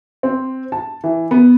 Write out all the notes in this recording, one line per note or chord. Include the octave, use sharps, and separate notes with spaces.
C4
A5
E3
B3